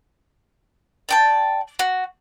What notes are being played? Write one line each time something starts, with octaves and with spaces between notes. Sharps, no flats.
D5 G5 A5
F#4